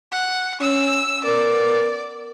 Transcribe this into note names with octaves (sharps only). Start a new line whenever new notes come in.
F#5
C#4 E6
B3 A#4 D5